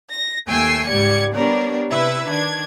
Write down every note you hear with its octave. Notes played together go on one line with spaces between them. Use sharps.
A#6
D#2 A3 G5 G#5 E6 C7
C#2 G#2 G3 D5 G#6 C#7
G3 B3 D4 A#4 C#5 D5
C3 E4 B4 E5
D#3 D4 G#6